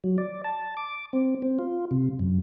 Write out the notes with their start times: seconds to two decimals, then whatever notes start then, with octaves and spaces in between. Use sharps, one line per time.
0.04 F#3
0.18 D5
0.44 A5
0.77 D6
1.13 C4
1.42 C4
1.59 F4
1.91 C3
2.19 F#2